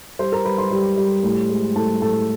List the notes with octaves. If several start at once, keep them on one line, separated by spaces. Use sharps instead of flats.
G3 C5 C6
A#4 A#5
G3 B4 B5
C5 C6
G3
G3
A2
G#3
A2 A4 A5
A2 A4 A5